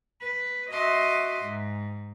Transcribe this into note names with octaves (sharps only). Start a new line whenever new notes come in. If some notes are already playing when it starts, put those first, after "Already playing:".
B4
F#4 D#5 E5 F#5 C6 D6
G#2